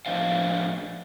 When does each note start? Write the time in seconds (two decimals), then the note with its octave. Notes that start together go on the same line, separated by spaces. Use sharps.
0.06 A2 F3 D4 C5 D#5 F5